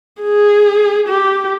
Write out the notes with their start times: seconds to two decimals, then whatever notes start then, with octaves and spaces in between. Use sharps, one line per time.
0.22 G#4
1.08 G4